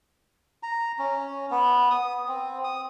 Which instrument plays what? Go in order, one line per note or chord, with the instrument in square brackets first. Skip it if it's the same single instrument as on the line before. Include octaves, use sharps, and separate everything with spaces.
[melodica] A#5
C#4
B3
D#6
C4
D#6